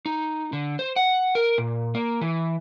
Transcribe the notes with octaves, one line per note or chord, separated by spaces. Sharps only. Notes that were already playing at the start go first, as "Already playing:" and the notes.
D#4
D3
C5
F#5
A#4
A#2
A#3
E3